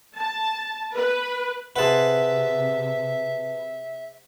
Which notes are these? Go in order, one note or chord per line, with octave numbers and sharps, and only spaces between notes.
A5
B4
C3 G#4 B4 C5 E5 F#5 A5